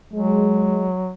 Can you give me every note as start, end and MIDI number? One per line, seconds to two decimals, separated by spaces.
0.13 1.13 54
0.13 0.89 56